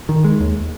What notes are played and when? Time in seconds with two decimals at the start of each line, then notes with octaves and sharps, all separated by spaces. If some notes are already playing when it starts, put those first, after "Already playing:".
0.09 D#3
0.25 G#3
0.40 D#2